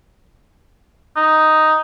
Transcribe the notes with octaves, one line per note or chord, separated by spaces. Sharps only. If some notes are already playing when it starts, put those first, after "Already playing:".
D#4